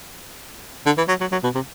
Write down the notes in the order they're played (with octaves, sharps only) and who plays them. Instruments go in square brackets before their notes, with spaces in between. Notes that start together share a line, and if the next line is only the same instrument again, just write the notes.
[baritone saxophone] D3
E3
F#3
F#3
F#3
B2
C3